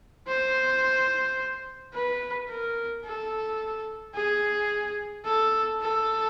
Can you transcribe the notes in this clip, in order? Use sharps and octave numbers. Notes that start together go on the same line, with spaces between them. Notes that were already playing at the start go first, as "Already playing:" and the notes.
C5
B4
A#4
A4
G#4
A4
A4